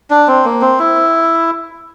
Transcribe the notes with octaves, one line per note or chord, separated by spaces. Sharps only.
D4
C4
A#3
C4
E4